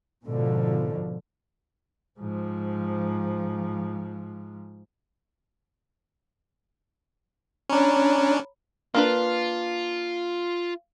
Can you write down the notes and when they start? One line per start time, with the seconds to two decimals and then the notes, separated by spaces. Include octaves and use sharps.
0.23 G#2 B2 D3 F3
2.20 G#2 F3
7.69 C#4 D4 C#5 A#5 B5
8.95 A#3 D4 F4 B4